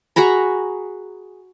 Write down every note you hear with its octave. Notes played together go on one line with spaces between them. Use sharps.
F#4 G#4 A#5 B5